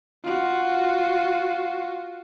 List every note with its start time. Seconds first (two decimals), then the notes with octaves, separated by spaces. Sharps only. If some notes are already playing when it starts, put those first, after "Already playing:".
0.24 F4 F#4